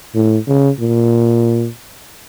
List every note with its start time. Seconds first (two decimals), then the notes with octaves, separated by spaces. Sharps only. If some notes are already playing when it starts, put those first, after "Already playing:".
0.15 A2
0.47 C#3
0.79 A#2